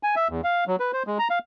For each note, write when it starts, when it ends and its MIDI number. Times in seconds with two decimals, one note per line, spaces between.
0.03 0.15 80
0.16 0.28 76
0.30 0.41 40
0.44 0.64 77
0.67 0.76 54
0.80 0.92 71
0.93 1.03 72
1.07 1.18 56
1.19 1.28 82
1.30 1.39 77